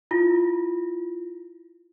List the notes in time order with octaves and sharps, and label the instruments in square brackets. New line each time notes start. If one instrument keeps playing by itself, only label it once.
[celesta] E4 F4